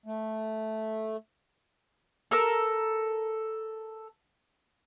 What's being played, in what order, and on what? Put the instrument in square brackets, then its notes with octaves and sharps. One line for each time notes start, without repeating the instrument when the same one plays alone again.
[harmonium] A3
[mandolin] A4 A#4 E6